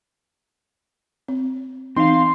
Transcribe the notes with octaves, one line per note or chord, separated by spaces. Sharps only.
C4
E3 C4 D#4 F5 C6